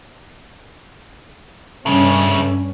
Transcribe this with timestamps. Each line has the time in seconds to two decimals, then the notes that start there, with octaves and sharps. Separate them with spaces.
1.86 G2 C#3 A3 C#4